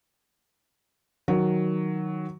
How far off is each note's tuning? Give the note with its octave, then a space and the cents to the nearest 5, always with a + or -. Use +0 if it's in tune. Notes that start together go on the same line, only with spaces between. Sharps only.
D#3 +0 F#3 +0